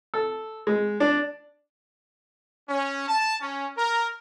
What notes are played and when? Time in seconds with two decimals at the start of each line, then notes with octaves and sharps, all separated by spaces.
0.14 A4
0.67 G#3
1.00 D4
2.69 C#4
3.08 A5
3.42 C#4
3.77 A#4